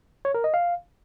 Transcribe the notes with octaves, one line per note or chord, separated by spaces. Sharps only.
C#5
A#4
D#5
F5